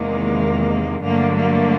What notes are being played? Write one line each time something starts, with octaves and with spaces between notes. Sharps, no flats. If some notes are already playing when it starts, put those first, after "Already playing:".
Already playing: E2 C3 D#3 G#3 A#3
G2 D3 F#3 A3 A#3
A#3